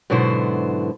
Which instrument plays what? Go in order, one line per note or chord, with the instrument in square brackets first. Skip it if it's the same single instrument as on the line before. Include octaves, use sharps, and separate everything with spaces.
[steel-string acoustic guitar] G#2 B2 D3 F#3 E4 C5